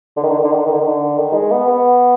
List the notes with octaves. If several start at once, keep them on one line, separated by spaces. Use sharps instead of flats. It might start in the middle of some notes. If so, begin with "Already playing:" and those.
D3
D#3
D3
D#3
D3
D#3
D3
D#3
D3
D#3
D3
D#3
G#3
B3
B3